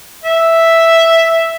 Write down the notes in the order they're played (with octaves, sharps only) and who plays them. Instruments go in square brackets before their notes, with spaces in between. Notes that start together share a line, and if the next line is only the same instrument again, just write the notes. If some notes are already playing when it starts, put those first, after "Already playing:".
[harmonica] E5